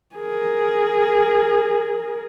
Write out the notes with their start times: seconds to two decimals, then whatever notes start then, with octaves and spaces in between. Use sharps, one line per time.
0.15 G#4 A#4